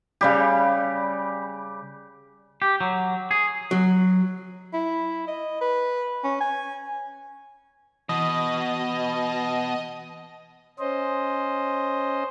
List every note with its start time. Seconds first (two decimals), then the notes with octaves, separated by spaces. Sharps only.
0.21 C#3 G3 G4
2.62 G4
2.81 F#3
3.31 G#4
3.71 F#3
4.73 E4
5.28 D#5
5.61 B4
6.24 C#4
6.41 G#5
8.09 B2 E3 D#5 D#6
10.79 C#4 C5 D#5